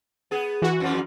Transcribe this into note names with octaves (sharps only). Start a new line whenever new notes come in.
B3 G#4
E3 F#4
F2 G#2 F3